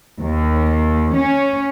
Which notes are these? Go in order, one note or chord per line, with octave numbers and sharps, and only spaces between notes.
D#2
C#4